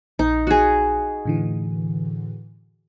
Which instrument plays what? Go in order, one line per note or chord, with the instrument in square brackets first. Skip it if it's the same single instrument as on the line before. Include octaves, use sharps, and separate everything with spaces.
[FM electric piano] A#1 [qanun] D#4
[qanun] F#4 G#4
[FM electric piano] A2 D3 E3